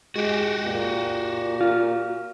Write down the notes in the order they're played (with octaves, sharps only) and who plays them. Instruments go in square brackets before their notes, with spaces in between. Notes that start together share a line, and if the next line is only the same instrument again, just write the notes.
[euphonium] G#3 [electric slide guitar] F#4 G4
[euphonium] A#2
[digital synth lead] F4